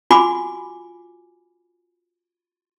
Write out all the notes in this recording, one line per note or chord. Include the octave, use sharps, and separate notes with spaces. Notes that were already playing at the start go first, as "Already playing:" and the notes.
F4 F#4 G#5 B5 D6